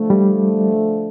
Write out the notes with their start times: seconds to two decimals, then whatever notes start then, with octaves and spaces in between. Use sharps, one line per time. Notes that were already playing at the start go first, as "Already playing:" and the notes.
Already playing: D3 F3 A3
0.10 G3